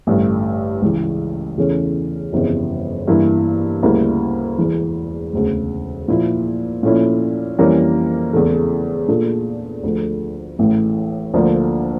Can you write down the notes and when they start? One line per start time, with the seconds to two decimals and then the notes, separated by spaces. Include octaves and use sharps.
0.07 A1 G2 D3
0.82 C#2 C#3 E3
1.57 E2 C#3 E3 A3 C#4
2.32 G1 F2 C#3 E3 G3
3.08 G2 E3 A#3 E4
3.83 D2 C#3 G3 A#3 E4
4.58 E1 E2 E3
5.33 E1 D2 C#3
6.08 A#2 F3 A#3 E4
6.83 A#2 F3 A3 C#4 E4
7.59 F2 E3 G3 A#3 C#4
8.33 E1 E2 C#3 E3 A3
9.08 A#2 A3 D4 F4 A4
9.83 D2 D3 F3 A3
10.59 A1 A2 E3
11.34 D2 D3 F3 A#3 D4